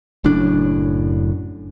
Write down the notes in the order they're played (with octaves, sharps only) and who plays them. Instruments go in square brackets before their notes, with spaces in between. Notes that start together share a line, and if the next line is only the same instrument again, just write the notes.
[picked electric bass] F#1 F#2 A2 D4